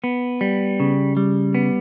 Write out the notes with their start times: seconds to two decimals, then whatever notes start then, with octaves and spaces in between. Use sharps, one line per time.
0.04 B3
0.41 G3
0.80 C#3
1.17 G3
1.55 B3